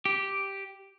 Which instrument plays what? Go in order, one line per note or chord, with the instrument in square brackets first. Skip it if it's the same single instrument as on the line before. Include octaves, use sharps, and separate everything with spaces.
[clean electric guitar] G4